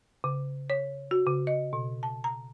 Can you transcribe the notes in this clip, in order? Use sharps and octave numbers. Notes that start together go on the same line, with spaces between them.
C#3
C#5
F#4
C#3
D#5
B2
A5
A#5